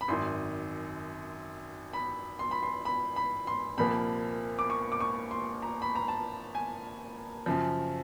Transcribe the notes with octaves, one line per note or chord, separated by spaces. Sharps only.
B5
G#1 F#2 D#3 C6
B5
C6
B5
C6
B5
B5
C6
C2 A#2 F3 A#3 B5
D6
C#6
D6
C#6
C6
A#5
B5
A#5
A5
G#5
F#2 C#3 F3